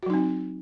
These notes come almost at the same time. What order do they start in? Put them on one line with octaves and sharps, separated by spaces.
F#4 F#3 D#4 C4